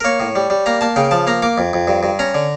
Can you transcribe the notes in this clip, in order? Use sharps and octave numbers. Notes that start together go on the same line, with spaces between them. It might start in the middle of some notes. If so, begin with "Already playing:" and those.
A#4
A#3 C#5
A2
G3
G3
A#3 A#5
A#3 A5
C#3 G5
F3 A5
A#3 A#5
A#3 D6
F2
F2
G2
G2
C#4 A#5
D3